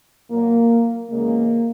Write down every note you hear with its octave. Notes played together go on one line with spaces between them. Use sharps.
A#2 F#3 A#3
E2 C#3 G#3 A#3